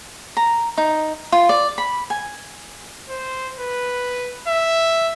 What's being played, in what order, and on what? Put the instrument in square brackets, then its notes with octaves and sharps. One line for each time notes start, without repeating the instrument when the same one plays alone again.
[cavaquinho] A#5
D#4
F4
D5
B5
G#5
[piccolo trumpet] C5
B4
E5